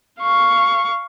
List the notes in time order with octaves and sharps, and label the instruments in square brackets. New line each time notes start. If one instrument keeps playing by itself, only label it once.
[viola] F5 C#6